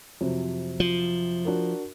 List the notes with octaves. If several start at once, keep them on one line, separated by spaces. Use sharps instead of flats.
F2 C3 F#3
F3
D4 F#4 A#4